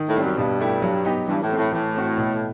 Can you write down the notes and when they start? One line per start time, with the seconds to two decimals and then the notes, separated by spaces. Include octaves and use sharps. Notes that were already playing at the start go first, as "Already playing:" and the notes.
Already playing: D#3
0.08 A2
0.16 G3 C4
0.23 F#2
0.37 G2 B2
0.60 A3 E4 G4
0.82 F#3
1.05 B3 D#4 G4
1.28 G2 E3
1.43 A2
1.50 A3 C4
1.58 A2
1.72 A2 E3
1.95 A3 C4 F#4
2.18 B2